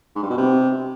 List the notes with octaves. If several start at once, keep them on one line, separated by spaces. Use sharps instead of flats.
G#2
G2
B2
C3